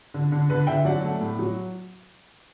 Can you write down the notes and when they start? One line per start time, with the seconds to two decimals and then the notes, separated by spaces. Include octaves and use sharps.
0.14 D3
0.32 D3
0.50 D3 B4
0.67 D3 E5 G5
0.85 F#3 D5 F#5
1.04 A3
1.21 A2
1.39 F#3